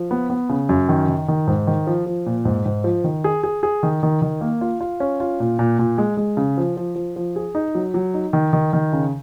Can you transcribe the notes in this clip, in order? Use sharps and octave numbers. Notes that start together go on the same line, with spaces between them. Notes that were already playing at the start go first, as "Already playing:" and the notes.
Already playing: F3
B3
B3
C#3
F#2
D#3
D#3
D#3
G#2
D#3
F3
F3
A#2
G#2
G#2
F3
D#3
G#4
G#4
G#4
D#3
D#3
D#3
A#3
F4
F4
C#4
F4
A#2
A#2
A#2
G#3
G#3
C#3
F3
F3
F3
F3
G#4
D#4
F#3
F#3
D#4
D#3
D#3
D#3
C#3